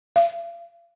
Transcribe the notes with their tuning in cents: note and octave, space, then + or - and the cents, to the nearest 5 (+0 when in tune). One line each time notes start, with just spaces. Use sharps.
F5 -35